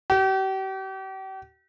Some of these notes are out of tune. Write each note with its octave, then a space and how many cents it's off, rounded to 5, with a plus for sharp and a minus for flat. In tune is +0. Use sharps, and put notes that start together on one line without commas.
G4 -40